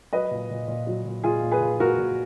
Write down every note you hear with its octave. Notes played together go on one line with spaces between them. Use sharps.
F#3 B4 D#5
A#2
A#2
A#2
F#3
A#2
A#2 F4 G#4
A#2
G#4 B4
A#2
A#2 F#4 A#4
A#2